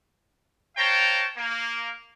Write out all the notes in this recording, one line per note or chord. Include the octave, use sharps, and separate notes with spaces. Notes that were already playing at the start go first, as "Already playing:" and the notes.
C5 C#5 F5 G5 A5 A#5
A#3